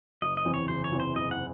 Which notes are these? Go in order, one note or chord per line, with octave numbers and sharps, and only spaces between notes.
F#1 D#5
D#5
E2 C3 E3 C4
C#5
F#1 C5
C#5
E2 C3 E3 C4
C5
F#1 D#5
F#5